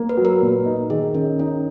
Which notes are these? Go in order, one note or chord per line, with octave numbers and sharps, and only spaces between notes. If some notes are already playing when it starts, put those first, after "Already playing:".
Already playing: A#3
B4
F#3
A#4
A#2
D#4
D#3 G#4
D#3 C#4
C#4 D#4